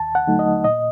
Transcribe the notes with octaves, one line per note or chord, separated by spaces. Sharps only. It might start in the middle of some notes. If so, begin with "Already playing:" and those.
Already playing: D#2 A5
F#5
D3 F#3 A3 D#4
D#5
A#2 D#5